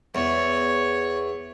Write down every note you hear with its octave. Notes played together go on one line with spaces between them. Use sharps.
E2 C#5